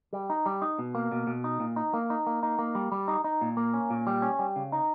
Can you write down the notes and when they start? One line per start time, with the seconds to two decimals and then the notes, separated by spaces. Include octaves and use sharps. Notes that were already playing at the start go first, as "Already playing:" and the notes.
0.13 G3
0.30 D#4
0.46 G3
0.62 D#4
0.79 B2
0.95 A#3
1.12 B2
1.27 B2
1.44 D#4
1.60 A#2
1.76 D#4
1.94 A#3
2.10 D#4
2.27 A#3
2.43 D#4
2.59 A#3
2.75 G3
2.92 G3
3.08 D#4
3.24 D#4
3.41 A#2
3.57 A#3
3.74 C#4
3.90 A#2
4.07 G3
4.22 C#4
4.39 G3
4.56 C#3
4.72 D#4